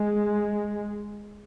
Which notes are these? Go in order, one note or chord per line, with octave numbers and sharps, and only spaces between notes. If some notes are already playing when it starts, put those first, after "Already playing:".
Already playing: G#3